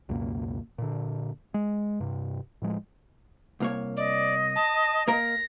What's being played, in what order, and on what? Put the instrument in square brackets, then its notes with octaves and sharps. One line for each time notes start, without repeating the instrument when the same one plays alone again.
[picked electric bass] C#2 F#2 B2 A#3
A#2 D3
G#3
G2 C3
A2 F3 G#3
[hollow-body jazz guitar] C2 A#3 C#5
[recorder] D5 [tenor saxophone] D#5
[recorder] A5
[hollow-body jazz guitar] A#3 A#4 [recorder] A#6